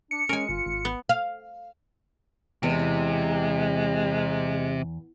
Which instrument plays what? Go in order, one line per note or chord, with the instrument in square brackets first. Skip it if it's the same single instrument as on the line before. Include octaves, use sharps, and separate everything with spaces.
[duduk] D4 [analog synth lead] C#7
[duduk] G#3 [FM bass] C#4 [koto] A#4 G#5
[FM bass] G1 [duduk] F4
[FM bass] G#1
[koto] B3
[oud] F5
[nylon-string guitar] E2 [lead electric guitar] C3 [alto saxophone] G#3